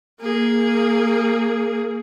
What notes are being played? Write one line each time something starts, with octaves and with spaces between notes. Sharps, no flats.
A#3 G#4